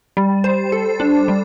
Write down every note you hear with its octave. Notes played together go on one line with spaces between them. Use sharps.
G3
C5
A4
D4
G3